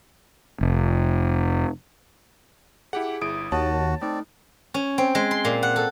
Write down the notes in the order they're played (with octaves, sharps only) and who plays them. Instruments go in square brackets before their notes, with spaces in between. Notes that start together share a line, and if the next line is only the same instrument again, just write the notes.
[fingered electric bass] F1
[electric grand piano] E4 G4 F#5 [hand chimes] G#4
[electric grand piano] G1 E4 D7 [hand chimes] D#6
[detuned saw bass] D#2 [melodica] F#4 [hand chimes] C#5 [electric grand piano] A5
[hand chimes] A3 D#4 [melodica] C4 D5
[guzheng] C#4
C4
G#3
C6
A#2
F#5
A4